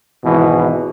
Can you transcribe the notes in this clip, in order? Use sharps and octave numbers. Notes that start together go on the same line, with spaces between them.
G#1 E2 B2 E3